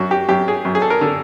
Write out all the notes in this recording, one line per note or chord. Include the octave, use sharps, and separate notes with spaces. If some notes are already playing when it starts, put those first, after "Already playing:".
Already playing: F#2 F#4
G4
F#2 G4
G#4
F#2
G#4
A4
A#4
D3